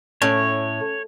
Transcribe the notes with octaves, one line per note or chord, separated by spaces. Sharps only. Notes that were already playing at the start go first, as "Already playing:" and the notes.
A2 C#4 C#5